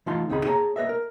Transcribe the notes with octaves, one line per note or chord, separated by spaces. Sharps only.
E3 A3 D#4 F4 A5 C6
C#2 C4 D#4 G#4 B5
A#3 G#4 C#5 G5 A5 A#5
A#3 B4 D#5 E5
A#4